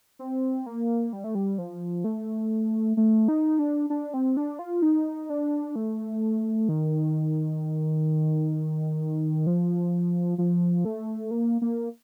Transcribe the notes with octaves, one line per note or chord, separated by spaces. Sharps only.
C4
A#3
G3
A3
G3
F3
A3
A3
D#4
D4
D4
C4
D4
F4
D#4
D4
A3
D#3
F3
F3
A3
A#3
A#3